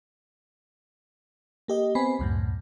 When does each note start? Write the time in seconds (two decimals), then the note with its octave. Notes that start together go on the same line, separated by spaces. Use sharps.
1.68 A#3 G4 D#5
1.95 B3 C4 G#5 B5
2.19 C#2 F#2 A2